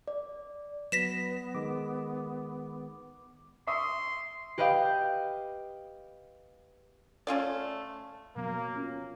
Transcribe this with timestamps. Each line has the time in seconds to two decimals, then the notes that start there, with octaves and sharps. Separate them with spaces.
0.08 D5
0.92 F#3 B3 B4 A#6 B6 E7
1.54 D#3 G#3 D6
3.67 E5 C6 C#6 D#6
4.58 G4 B4 D#5 F5 G5
7.27 A3 C#4 F4 D5
8.36 B2 F#3 A#3 B3
8.76 C#4 F4